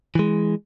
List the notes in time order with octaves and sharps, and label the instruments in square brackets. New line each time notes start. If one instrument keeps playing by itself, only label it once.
[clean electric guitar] E3 G#3